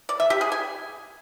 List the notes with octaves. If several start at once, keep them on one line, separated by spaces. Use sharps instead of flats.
D5
E5
G4
G#4
G#5